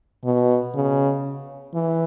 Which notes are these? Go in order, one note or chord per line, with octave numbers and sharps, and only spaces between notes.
B2
C#3
E3